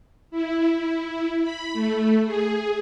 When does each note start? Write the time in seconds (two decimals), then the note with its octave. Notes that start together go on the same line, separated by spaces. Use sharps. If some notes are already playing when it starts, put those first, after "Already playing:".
0.31 E4
1.42 B5
1.73 A3
2.25 G#4